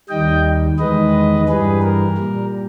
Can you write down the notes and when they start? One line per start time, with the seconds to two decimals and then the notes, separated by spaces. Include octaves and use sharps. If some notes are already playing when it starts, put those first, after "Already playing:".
0.09 D#2 D#3 G3 D#5 G5
0.79 E2 D#3 G#3 B4 D#5
1.49 G2 E3 G3 G#4 B4
1.83 A#4
2.18 A#2 G3